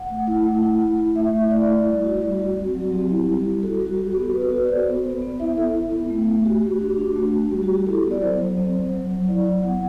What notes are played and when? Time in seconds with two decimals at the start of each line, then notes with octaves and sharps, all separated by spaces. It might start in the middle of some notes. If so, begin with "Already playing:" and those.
Already playing: F#5
0.10 A3
0.27 E4
0.45 A3
0.63 E4
0.81 E4
0.98 E4
1.16 A3 E5
1.33 A3
1.51 E4 D5
1.68 E4
1.86 G3
2.04 F#4
2.22 G3
2.39 F#4
2.57 C4
2.75 F#3
2.92 C4 G4
3.10 E4
3.27 G3
3.45 G3
3.63 F#4 A4
3.75 F#4
3.81 G3
3.86 F#4
3.98 F#4 G4
4.16 B3 A4
4.33 F#4 B4
4.42 A4
4.50 F#4 B4
4.65 D5
4.69 B3 C5
4.87 B3
5.04 B3
5.22 B3
5.40 E4 E5
5.57 E4 A4
5.75 E4
5.93 B3
6.10 A3
6.28 A3
6.45 F#4 G4
6.63 F#4
6.81 D4
6.98 D4
7.16 A3 F#4
7.34 F#4
7.51 G3 G4
7.63 F#4
7.69 G3
7.75 G4
7.86 E4 A4
8.04 B3
8.11 D5
8.22 F#3 C5
8.40 F#3
8.57 C4
8.75 F#3
8.92 F#3
9.10 F#3
9.28 E4 D5
9.46 F#3
9.63 B3 F#5